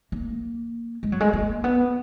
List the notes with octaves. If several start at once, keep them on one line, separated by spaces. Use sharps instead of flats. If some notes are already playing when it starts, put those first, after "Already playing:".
A#3
G#3
F#3
G#3
A#3
B3